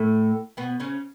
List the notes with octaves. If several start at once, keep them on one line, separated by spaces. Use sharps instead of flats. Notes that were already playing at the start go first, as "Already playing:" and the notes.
Already playing: A2 A3
B2 B3
C#3 C#4